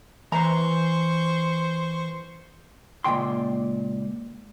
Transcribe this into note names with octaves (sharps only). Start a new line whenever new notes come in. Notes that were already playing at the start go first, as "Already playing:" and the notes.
E3 C5 A#5 C#6
C#2 A#2 C#3 G5 C6